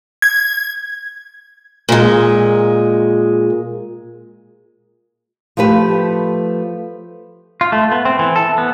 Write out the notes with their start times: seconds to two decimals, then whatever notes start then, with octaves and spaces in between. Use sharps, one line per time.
0.22 G#6
1.89 A#2 G#3
5.57 F3 A3 G4 B4
7.61 F4
7.72 A3
7.92 B3
8.05 C4
8.19 E3
8.36 A4
8.58 B3